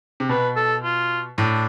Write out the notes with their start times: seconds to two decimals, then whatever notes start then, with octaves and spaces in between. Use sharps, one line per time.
0.20 C3
0.29 B2 B4
0.56 A4
0.84 F4
1.38 A2 D4